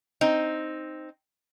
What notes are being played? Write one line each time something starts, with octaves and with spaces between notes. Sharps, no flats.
C4 D#4